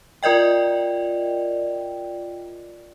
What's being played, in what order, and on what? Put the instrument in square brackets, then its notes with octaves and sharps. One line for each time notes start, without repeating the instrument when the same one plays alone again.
[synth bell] F4 A#4 D5 D#5 G5